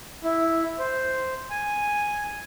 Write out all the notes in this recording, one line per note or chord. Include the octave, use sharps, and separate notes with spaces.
E4
C5
G#5